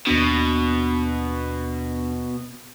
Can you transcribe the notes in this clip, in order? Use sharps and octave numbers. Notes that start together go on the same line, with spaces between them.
D#2 B2 D4